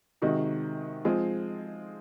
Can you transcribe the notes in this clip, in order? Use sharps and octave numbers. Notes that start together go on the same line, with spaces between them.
C3 D#3 G#3 D#4 F#4
F3 G#3 C4 F4 G#4